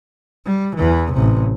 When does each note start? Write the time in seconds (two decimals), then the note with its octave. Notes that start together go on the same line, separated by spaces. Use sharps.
0.46 G3
0.76 E2 E3
1.13 A1 C3